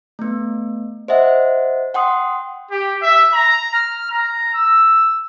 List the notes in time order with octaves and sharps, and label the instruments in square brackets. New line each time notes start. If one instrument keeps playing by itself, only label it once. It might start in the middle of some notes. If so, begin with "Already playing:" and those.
[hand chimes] A3 B3
C5 D#5 E5 F#5
F#5 G5 C6 D#6
[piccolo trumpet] G4
E5
A#5
F6
A#5
E6